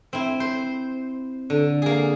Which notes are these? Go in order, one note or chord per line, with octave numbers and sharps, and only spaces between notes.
C4 E4
C5
D3
A#3 G#4